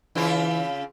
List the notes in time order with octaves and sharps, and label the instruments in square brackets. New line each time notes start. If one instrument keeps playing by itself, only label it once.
[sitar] C#3 C4 F4 [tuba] E3